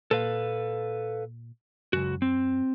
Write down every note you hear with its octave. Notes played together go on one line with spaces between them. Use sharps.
A#2 A4 B4 F5
C#2 F#2 F#4
C4